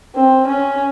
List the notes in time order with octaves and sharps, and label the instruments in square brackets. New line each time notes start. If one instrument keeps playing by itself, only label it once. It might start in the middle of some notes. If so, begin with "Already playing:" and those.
[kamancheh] C4
C#4